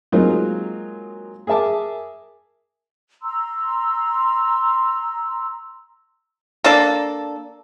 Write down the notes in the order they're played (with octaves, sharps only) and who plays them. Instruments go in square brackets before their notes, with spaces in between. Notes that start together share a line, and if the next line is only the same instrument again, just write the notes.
[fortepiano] F#3 G#3 A#3 C4 D#4 F4
G#4 A#4 E5 A5 D6
[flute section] A#5 C6 E6
[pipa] A#3 D4 A4